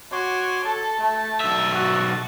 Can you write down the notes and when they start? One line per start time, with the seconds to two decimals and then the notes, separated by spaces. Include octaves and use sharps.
0.12 F#4 C#5 C6 D6
0.65 A4 A5
1.00 A3
1.40 B1 E5
1.73 F#4